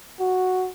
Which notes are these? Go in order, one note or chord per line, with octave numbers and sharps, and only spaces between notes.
F#4